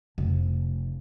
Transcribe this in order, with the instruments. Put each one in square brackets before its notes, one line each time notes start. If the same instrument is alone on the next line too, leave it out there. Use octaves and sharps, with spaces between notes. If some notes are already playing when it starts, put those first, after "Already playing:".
[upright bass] F1